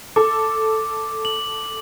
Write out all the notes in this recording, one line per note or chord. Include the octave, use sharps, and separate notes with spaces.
A4 D6
F#7